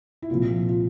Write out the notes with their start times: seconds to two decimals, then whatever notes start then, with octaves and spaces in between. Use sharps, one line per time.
0.22 E4
0.30 C2 A#2 F3 F4
0.69 F4